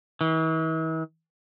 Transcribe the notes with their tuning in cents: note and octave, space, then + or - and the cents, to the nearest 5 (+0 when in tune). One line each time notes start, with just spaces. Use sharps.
E3 -45